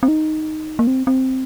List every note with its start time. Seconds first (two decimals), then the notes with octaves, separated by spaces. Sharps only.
0.03 C4
0.08 D#4
0.79 A#3
0.87 C4
1.07 C4